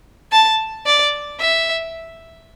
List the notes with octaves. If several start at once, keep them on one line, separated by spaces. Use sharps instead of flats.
A5
D5
E5